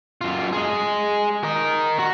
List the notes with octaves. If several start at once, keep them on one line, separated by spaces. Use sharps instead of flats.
F#2 F4
G#4 D#5
A#4 D#5
F#4